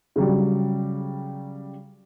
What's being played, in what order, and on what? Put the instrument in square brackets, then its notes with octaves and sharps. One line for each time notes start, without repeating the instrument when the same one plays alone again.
[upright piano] C#3 F#3 G3